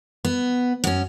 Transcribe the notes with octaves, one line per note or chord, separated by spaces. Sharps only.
B3
F#2 C#4